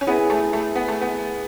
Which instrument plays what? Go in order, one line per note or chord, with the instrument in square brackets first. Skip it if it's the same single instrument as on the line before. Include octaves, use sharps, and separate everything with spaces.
[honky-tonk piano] C#4
[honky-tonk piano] B3 [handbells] E4 G#4 B4 E5 G#5
[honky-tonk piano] A3
A3
B3
A3
B3